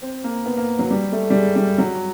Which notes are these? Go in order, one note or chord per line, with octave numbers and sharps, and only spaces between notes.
C4
A#3
B3
A#3
F#3
G3
A3
G3
G#3
G3
F#3